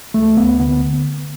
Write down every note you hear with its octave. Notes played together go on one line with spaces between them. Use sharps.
D2 A3
D2 B3
D3 B3